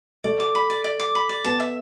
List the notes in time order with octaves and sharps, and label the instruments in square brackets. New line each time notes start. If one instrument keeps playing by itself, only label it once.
[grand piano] A3 [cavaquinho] D5
[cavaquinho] D6
B5
D5
D5
D6
B5
D5
[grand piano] B3 [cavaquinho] A5
[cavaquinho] E5